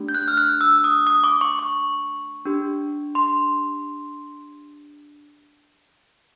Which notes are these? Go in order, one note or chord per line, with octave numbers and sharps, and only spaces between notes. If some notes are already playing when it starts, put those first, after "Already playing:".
Already playing: A3 D4 G4
G6
F#6
F6
F#6
E6
D#6
D#6
D6
C#6
C#6
D4 G4
C6